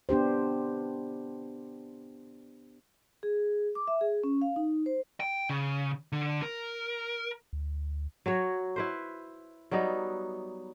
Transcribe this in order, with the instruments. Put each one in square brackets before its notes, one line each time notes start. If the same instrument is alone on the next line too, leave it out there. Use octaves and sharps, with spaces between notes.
[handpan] B3 D4 G4 C5
[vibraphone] G#4
D6
E5
G#4
C#4
F5
D#4
C5
[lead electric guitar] G5
C#3
D3
A#4
[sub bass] D2
[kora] F#3 F#4 C#5
E4 B4 C5
F#3 G3 B3 D#4